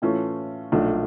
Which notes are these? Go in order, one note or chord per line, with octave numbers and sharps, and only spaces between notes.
A2 E3 A3 C#4 F4
B1 A#2 F3 A3 D4